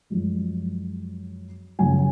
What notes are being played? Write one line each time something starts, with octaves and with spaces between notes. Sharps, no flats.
F#2 F3 G#3
F#2 C#3 F3 G#5